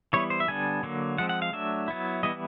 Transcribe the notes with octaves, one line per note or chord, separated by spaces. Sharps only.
E3 G3 B3 E4 C#5
C5
E5
D3 G3 B3 D4 G#5
D3 F#3 A#3
F3 G#3 C4 F#5
F#5
F5
F#3 A3 D4 E5
F#3 B3 E4
E3 G3 B3 E4 D#5